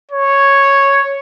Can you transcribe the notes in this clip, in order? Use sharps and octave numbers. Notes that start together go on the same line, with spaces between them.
C#5